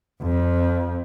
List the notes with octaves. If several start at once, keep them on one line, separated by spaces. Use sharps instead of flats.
F2